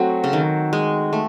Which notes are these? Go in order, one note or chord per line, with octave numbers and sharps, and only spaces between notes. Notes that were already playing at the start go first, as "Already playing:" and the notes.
Already playing: F#3 A3 C4 F#4
C#3
D#3
G#3
A3